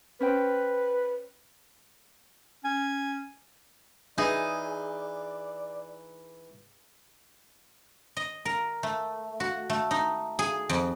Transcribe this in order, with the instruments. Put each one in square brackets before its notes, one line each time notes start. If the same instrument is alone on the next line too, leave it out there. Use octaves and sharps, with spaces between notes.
[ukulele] C#4 C5 G5 [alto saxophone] B4
[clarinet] C#4 [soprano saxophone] G#5
[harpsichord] E3 [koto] D#4 G#4 [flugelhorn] D5
[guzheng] D#5
A#4
A3
F#4
A3
D#4
G#4
F2